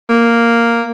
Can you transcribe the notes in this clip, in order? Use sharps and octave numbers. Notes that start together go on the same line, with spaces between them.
A#3